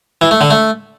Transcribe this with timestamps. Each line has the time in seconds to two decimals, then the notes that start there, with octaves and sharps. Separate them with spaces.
0.21 E3
0.31 A3
0.41 D3
0.50 A3